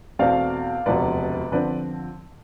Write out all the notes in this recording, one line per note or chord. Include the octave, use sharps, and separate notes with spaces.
E2 B2 A3 C4 D5 F5
E1 D2 C3 F3 B4 D5
D3 F3 C4 B4 D5